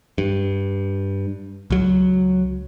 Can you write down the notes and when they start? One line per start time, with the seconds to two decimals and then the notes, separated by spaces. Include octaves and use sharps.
0.18 G2
1.70 C#2 F#3